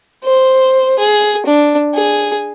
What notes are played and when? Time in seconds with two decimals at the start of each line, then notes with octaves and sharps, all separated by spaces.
0.24 C5
0.99 G#4
1.46 D4
1.94 G#4